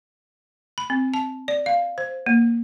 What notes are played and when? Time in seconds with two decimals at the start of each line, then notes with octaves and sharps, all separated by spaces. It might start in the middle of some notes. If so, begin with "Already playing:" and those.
0.78 B5
0.90 C4
1.14 A5
1.48 D5
1.66 F5
1.98 C5
2.26 A#3